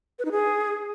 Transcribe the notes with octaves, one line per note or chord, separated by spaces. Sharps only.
B4
D#4
G#4